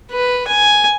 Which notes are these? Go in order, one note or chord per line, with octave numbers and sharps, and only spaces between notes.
B4
G#5